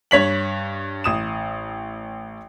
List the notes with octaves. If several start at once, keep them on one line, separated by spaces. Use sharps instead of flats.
G2 C#5 B6 F#7
A1 D#6 E7